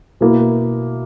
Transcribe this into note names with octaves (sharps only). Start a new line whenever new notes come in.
B2 A#3 E4